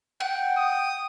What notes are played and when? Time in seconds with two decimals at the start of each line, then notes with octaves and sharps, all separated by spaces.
0.20 F#5 G5
0.57 D#6